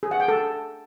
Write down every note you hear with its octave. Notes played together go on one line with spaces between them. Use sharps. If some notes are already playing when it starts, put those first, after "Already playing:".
G#4
F#5
G5
A4